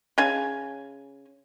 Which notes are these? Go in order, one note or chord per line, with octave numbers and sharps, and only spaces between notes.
C#3 C#4 G#5